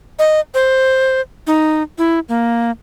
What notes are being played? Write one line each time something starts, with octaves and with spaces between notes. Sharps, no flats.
D#5
C5
D#4
E4
A#3